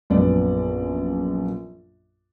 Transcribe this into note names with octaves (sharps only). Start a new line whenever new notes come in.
A#1 F#2 B3 D5